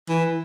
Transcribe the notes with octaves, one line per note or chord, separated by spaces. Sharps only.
E3